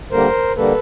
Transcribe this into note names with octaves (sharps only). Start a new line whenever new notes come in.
D3 G3 A#3 A#4 C5
D3 G3 A#3 A4 B4